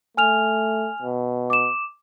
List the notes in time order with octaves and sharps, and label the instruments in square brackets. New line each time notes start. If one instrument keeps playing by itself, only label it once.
[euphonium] A3 [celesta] G#5 F6 F7
[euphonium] B2
[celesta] D6 E7